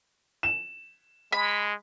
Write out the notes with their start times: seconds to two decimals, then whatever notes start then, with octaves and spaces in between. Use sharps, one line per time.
0.43 E7
1.32 G#3 B5